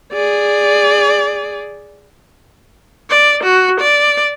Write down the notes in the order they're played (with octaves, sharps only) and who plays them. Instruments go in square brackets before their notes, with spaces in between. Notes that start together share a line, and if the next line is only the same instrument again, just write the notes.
[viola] G#4 D5
D5
F#4
D5